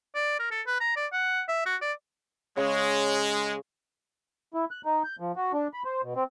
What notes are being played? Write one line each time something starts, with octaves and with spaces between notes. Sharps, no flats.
D5
A#4
A4
B4
A#5
D5
F#5
E5
F#4
D5
C#3 G#3 C#5 C#6
E4
F#6
D#4
G6
F3
F#4
D4
B5
C5
B2
C4